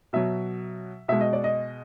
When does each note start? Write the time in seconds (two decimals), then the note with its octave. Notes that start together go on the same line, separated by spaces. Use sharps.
0.13 B2 F#3 E5
1.08 B2 G#3 E5
1.21 D#5
1.33 D5
1.44 D#5